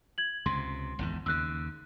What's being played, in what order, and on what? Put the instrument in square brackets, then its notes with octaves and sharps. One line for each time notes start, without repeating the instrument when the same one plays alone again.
[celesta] G#6 F#7
[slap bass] C#2 C3 [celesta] C6
[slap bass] G#1 E2 G#2
[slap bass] D#2 C#3 [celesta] E6 F#6